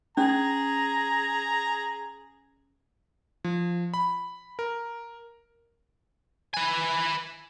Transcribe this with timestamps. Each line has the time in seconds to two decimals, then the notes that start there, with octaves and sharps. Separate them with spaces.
0.17 C#4 G#4 A#5
3.44 F3
3.94 B5
4.59 A#4
6.54 B4 G#5